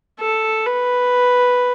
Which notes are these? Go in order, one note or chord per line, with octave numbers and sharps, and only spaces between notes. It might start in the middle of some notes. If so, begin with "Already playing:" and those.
A4
B4